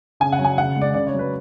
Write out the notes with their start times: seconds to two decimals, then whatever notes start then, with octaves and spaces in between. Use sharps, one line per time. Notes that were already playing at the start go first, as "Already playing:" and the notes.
0.20 C#3 G#5
0.32 F#5
0.39 F#3
0.45 G#5
0.58 C#3 F#5
0.76 G#3
0.81 D5
0.94 C#3 D5
1.07 C#5
1.14 F#3
1.19 B4